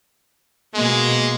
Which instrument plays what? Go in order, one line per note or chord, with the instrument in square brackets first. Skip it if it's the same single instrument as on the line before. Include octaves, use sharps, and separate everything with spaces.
[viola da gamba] B2 A#3 [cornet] G#3